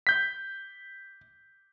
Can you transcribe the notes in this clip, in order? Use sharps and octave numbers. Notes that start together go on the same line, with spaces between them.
G6 B6